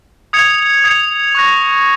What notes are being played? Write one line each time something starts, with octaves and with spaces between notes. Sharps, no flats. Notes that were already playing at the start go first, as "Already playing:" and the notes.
D#6 G#6 C#7 F7
D#6 G#6 C#7 F7
C#6 F#6 A#6